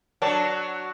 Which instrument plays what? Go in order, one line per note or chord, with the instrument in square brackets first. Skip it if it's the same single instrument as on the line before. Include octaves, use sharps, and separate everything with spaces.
[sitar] F#3 D4 [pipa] C#5 D5 A5